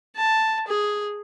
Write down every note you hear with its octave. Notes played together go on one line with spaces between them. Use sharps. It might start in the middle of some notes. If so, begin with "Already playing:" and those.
A5
G#4